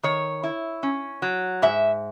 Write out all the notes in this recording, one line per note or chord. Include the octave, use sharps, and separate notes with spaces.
D#3 C#5
E4
C#4
F#3
G#2 E5